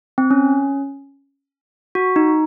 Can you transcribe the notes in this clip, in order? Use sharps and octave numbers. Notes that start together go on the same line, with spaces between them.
C4
C#4
F#4
D#4